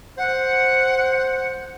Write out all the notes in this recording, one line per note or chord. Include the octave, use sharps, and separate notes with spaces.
C5 F#5